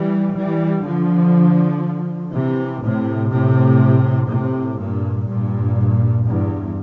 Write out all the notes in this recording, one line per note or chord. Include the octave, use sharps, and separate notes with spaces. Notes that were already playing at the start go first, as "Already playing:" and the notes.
Already playing: E3 G3
E3 G3
D3 F3
C3 E3
A2 C3
A2 C3
A2 C3
G2 A#2
G2 A#2
E2 G2